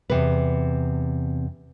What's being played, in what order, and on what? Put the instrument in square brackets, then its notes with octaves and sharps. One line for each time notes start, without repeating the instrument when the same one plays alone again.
[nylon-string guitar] E2 C3 B4